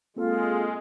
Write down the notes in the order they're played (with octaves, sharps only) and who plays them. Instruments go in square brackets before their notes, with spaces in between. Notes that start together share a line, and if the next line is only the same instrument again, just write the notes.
[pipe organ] G#3 [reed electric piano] A#3 C4 A4 [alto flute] F4